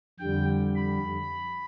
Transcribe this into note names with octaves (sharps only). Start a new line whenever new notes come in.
F2 D3 G3 G5
B5